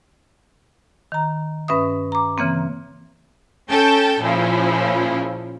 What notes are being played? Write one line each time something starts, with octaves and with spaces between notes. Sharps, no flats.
D#3 A#5
G2 C#4 B4 E5 D#6
A#5 D6
C#3 E3 A#3 C4
C#4 A4 G5 A5
A#2 C#3 F3 E4